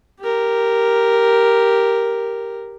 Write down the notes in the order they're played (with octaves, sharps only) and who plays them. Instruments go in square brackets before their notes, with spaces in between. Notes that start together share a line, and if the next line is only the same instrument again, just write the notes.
[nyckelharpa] G4 A#4